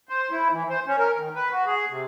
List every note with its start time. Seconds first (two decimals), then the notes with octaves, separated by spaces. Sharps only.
0.09 C5
0.31 E4
0.51 E3
0.70 C5
0.86 C#4
0.99 A#4
1.16 D#3
1.35 B4
1.51 F#4
1.66 G#4
1.89 C3